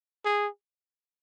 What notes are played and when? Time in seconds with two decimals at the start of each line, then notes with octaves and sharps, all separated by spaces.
0.25 G#4